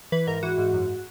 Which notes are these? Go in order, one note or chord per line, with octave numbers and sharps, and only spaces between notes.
E3 B4
G#2 A#4
E3 F#4
G#2
F#2